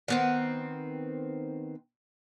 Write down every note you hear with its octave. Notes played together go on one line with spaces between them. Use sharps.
D#3 B3 C4